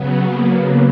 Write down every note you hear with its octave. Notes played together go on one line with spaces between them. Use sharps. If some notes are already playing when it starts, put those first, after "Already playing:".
Already playing: C#3 F#3 B3
A#3